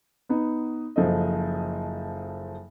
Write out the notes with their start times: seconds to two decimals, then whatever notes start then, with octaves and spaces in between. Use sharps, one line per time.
0.29 B3 D#4
0.96 F#1 F3 A4 D#5